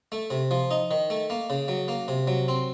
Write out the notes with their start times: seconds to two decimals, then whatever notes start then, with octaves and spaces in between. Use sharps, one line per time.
0.12 A3
0.30 C3
0.51 F3
0.71 D#4
0.91 D#3
1.10 A3
1.30 A#3
1.50 C#3
1.68 F#3
1.88 A#3
2.08 C3
2.27 F#3
2.48 C4